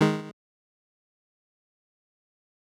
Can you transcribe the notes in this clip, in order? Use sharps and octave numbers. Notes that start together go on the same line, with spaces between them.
D#3 G#3